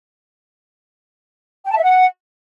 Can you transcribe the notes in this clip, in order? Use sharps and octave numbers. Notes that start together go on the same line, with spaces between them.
G5
A5
E5
F#5